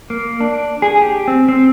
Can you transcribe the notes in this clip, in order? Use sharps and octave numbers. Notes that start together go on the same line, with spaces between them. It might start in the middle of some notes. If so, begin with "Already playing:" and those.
A#3
D4
G#4
G4
C4
C4